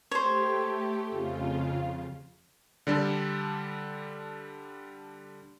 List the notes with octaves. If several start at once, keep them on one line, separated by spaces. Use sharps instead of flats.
A3 G4 C5 C#5
F2 C#3 F4
D3 G3 D4 A4